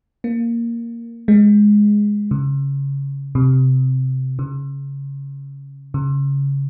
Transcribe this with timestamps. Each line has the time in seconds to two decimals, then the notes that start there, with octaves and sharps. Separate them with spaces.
0.24 A#3
1.28 G#3
2.31 C#3
3.35 C3
4.39 C#3
5.94 C#3